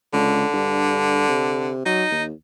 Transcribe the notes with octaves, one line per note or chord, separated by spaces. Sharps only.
C#2 D3
G2
C3
F#3 D#4
D#2